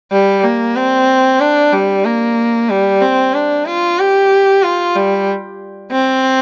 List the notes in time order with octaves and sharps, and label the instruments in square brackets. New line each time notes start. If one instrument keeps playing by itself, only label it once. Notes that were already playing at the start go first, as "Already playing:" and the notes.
[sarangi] G3
A#3
C4
D4
G3
A#3
G3
C4
D4
F4
G4
F4
G3
C4